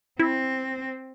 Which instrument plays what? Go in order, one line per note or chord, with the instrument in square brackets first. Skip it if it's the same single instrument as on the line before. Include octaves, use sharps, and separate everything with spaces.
[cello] C4 [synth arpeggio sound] E4